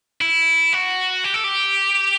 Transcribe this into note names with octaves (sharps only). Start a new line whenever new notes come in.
E4
F#4
G4
A4
G4